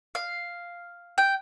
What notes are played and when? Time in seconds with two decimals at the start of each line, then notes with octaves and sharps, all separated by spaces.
0.15 F5
1.18 G5